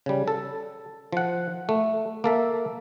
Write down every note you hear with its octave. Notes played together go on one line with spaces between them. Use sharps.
C#3 G3
A4
F3 F#5
A3
A#3 A4 E5